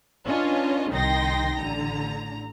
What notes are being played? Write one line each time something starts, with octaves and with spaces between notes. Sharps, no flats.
C#4 D4 F4 B4 C#5 D#5
C2 D#3 D#4 G5 C6 A#6
A1 D3 A#5